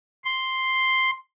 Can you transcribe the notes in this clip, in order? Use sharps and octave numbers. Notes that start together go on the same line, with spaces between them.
C6